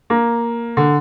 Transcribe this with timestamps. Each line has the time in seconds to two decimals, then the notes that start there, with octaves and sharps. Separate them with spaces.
0.10 A#3
0.77 D3